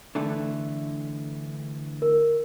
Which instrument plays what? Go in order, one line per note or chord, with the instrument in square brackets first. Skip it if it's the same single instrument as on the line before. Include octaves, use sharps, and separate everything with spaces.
[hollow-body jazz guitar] D3 E3 A3
[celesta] A#4